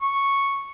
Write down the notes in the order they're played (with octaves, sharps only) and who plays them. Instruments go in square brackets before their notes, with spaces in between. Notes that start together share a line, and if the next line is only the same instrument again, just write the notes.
[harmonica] C#6